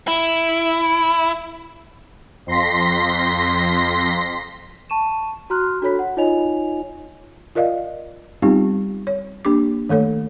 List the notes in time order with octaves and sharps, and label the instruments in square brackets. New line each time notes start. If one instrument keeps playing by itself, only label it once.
[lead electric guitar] E4
[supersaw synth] F2 C6 A#6 B6
[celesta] A5 C#6 D#7 E7
F#4 A#5 C6 F6 F#6
D4 F#4 A4 C#5 B5 B6
F#5
D#4 F4 C#5 D#5 G#5 F7
[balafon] F4 A#4 D5 D#5 F5
G3 B3 C4 D#4 F4 G4
C#5
A#3 D4 G4 D6
D#3 A3 A4 C#5